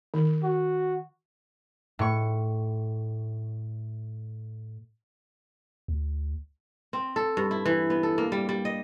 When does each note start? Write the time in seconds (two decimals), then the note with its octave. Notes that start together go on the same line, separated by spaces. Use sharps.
0.14 D#3
0.43 F#4
1.99 A2 C#6
5.88 D2
6.93 C4
7.16 A4
7.37 G2
7.51 E4
7.66 E3
7.90 B3
8.03 A4
8.18 A#3
8.32 G3
8.49 G3
8.65 D#5